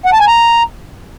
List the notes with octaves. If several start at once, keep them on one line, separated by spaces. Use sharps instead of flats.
F#5
A5
G#5
A#5